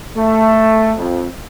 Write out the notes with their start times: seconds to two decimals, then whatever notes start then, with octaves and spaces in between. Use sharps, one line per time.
0.17 A3
0.96 F2